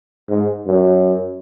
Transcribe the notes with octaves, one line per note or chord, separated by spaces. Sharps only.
G#2
F#2